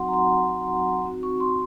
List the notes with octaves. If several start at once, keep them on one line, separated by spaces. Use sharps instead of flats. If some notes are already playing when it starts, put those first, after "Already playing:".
Already playing: F#3 C4 D#4 F#4 F#5 C6
A#5
C6
C4 D#4 F#4
C#6
C6